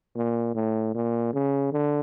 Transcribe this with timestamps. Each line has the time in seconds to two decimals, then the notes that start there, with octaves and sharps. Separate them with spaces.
0.16 A#2
0.55 A2
0.94 A#2
1.33 C#3
1.72 D3